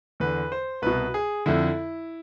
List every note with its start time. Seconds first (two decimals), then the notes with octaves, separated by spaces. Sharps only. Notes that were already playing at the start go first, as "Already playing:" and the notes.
0.20 E2 D3 B4
0.52 C5
0.82 C2 B2 B4
1.14 G#4
1.46 F2 D3 E4